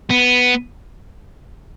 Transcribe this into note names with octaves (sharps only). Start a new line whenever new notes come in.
B3